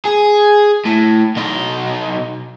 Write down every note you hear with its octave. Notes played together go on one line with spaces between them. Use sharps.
G#4
A2
B1 D#4